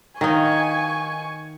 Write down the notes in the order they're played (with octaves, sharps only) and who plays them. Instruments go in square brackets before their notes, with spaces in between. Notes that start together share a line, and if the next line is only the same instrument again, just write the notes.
[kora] D#3 D#4 [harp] A#4 D#5 F5 [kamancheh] G#5 C#6